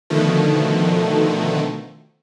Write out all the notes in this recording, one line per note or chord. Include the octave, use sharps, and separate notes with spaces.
B2 D3 D#3 F3 A3